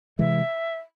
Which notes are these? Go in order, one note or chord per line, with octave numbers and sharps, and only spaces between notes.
C3 E3 G#3 E5